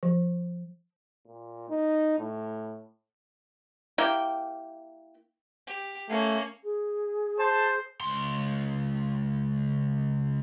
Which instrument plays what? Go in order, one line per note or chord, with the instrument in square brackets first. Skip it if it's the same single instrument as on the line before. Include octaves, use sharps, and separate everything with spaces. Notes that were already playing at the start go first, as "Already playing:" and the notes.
[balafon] F3
[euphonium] A#2
D#4
A2
[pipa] A#3 E4 G4 G5
[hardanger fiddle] G4
[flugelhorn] A3 [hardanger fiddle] A#3 C#4
[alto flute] G#4
[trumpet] C5 [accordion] A5
[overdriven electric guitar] C#2 C6